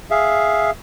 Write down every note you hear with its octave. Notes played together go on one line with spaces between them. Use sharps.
G#4 E5 F5